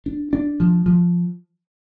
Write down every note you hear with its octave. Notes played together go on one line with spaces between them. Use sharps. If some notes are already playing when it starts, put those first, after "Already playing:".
D4
D4
F3
F3